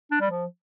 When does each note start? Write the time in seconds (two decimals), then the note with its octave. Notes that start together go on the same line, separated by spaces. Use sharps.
0.11 D4
0.21 G3
0.30 F3